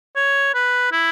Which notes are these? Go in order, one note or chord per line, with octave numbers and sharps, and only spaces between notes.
C#5
B4
E4